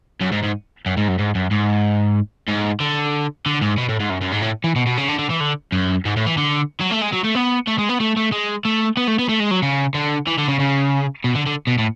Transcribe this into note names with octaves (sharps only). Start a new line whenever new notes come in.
F#2
G#2
G#2
F#2
G#2
F#2
G#2
F#2
G#2
G#2
D3
D3
G#2
B2
A2
G#2
F#2
F#2
G#2
A2
E3
B2
B2
C#3
D3
D3
E3
D3
F#2
G#2
A2
E3
D3
F#3
A3
G#3
F#3
A3
B3
A3
G#3
B3
A3
A3
G#3
A3
B3
A3
B3
A3
G#3
F#3
C#3
D3
E3
D3
C#3
C#3
B2
D3
D3
B2
A2